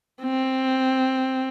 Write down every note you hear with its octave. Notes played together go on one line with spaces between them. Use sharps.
C4